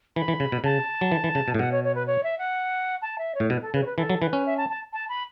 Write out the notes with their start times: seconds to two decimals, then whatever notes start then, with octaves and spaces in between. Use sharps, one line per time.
0.16 E3 B5
0.28 E3
0.40 C#3
0.52 B2
0.64 C#3 A5
1.01 F#3
1.12 E3
1.24 E3
1.35 C#3
1.48 B2
1.54 A2
1.59 B2 F#5
1.71 C#5
1.84 C#5
1.95 B4
2.06 C#5
2.23 E5
2.38 F#5
3.02 A5
3.18 E5
3.34 C#5
3.40 A2
3.50 B2 B4
3.62 A4
3.74 C#3 B4
3.82 C#5
3.86 B4
3.97 E3 A4
4.10 F#3
4.21 E3 B4
4.33 C#4
4.46 E5
4.57 A5
4.69 A5
4.93 A5
5.09 B5